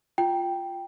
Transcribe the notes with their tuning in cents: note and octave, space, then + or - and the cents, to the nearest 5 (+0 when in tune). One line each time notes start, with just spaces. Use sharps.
F4 +0 G5 +0